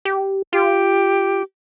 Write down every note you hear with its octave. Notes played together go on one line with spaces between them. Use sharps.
G4
F4 G4